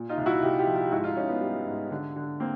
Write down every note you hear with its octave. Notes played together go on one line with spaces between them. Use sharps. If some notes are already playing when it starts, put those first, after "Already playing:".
Already playing: A#2
D#4 F4
C2
E4 F#4
C2 F4 G4
F4 G4
F3
F4 G4
G#2 E4 F#4
D#4 F4
G#2 C#4 D#4
B3 C#4
G3
G#2
D3
D3
A#3 C4